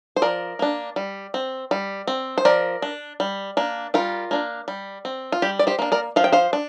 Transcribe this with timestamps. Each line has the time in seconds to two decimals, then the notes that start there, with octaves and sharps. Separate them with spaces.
0.16 C5
0.22 F3 A#4 D5
0.59 A#3 D4
0.96 G3
1.34 C4
1.71 G3
2.07 C4
2.38 C5
2.45 F3 A#4 D5
2.82 D4
3.20 G3
3.57 A#3 D4
3.94 G3 F4 A#4
4.31 A#3 D4
4.68 G3
5.05 C4
5.32 F4
5.42 G3 G4
5.59 D5
5.67 G4 C5
5.79 A#3 D4
5.92 A#4 D5
6.16 F3 F5
6.24 G5
6.32 C5 F5
6.53 D4